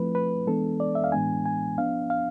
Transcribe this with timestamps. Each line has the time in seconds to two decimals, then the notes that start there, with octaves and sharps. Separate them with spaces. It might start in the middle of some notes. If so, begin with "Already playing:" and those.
Already playing: F3 A3 C4 E4 B4
0.15 B4
0.47 E3 G#3 B3 D4 A4
0.80 D5
0.95 E5
1.04 F5
1.12 A2 E3 G#3 B3 D4 G#5
1.45 G#5
1.78 F3 B3 D4 F5
2.10 F5